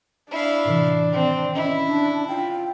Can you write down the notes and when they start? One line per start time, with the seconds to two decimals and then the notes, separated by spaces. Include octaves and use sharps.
0.31 D4 E4 F5
0.65 A2 C3 E3
1.12 D#3 C4
1.55 C#4 E4 D#5
1.86 D4
2.28 F4 G5